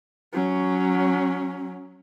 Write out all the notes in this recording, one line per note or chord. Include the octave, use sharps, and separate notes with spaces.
F#3 C#4